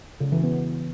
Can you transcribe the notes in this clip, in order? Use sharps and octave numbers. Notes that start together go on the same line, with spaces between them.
C#3
E3
B3